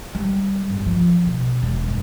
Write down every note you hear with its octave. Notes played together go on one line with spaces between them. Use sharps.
G3
G1
F3
B2
E1
G2